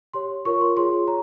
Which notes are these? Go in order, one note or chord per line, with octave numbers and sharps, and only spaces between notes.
G4 C#5 C6
F4 A#4 C#5 C#6
C6
F4 G#4 C#5 C6
C#5 A#5